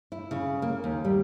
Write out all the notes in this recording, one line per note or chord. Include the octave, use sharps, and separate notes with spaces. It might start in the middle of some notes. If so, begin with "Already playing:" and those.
E4
C#3
A#3
D#2
G3